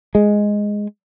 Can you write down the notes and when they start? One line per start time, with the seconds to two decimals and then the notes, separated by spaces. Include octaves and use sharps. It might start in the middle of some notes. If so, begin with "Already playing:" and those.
0.15 G#3